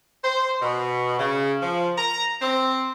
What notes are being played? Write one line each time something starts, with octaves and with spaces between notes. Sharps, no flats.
C5
B2
C#3
F3
A#5
C4